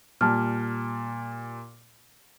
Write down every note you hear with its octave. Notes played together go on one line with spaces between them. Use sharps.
A#2 G3 A5 F6